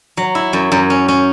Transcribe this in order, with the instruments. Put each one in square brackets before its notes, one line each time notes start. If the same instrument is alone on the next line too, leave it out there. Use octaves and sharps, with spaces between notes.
[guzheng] F#3
E4
F#2
F#2
C#4
C#4